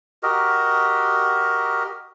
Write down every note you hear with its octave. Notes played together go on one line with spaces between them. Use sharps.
F#4 G4 A#4 D#5